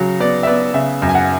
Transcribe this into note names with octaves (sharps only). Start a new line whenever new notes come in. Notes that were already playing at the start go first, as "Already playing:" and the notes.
Already playing: C#3 F#3
B3 D5
E5
B3 D5
C#3 E5
F#2
G#5
F#5